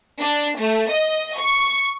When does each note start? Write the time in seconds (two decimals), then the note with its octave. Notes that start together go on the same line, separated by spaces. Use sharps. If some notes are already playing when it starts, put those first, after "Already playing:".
0.20 D4
0.58 A3
0.89 D#5
1.37 C#6